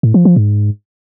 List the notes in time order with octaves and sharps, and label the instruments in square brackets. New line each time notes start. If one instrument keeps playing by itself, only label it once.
[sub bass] A2
F3
F3
G#2